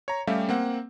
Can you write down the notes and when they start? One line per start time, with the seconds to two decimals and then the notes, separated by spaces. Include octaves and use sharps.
0.08 C#5 A#5
0.27 G3 A3 C#4 G4 E5 F5
0.49 A#3 C4 F#5